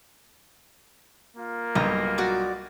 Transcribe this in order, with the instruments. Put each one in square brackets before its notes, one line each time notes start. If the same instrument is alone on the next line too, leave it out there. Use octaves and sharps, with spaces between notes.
[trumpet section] A#3 F4
[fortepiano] B1 G2 [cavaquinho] A#5
[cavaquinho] F#4 D5